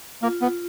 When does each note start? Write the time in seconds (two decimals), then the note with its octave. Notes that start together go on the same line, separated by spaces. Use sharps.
0.22 A#3 F4
0.42 B3